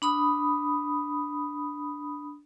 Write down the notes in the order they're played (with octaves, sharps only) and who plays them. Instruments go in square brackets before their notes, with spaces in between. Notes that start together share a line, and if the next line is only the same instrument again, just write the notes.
[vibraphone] D4 B5 D#6